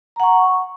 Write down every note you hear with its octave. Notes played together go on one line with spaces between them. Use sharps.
F#5 A#5 C#6